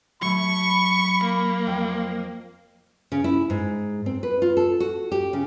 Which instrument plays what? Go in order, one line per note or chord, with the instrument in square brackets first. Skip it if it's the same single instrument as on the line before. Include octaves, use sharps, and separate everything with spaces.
[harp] F#3 A3 [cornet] B5 [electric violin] C#6
[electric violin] A#3
[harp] F2 C4 G5
[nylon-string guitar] C#3
E4
G#2
C4
B4
F4
A4
F#4
G4
C#3